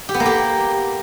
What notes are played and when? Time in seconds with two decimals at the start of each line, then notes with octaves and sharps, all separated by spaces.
0.09 G4
0.14 B3
0.20 A#3
0.26 G4